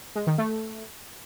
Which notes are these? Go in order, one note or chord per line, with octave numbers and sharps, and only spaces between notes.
G#3
D#3
A3